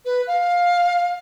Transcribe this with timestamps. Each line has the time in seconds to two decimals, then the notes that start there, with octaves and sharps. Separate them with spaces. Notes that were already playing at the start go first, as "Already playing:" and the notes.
0.05 B4
0.27 F5